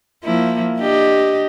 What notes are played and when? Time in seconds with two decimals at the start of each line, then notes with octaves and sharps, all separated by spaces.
0.24 F3 A#3 E4
0.78 D4 G4 D#5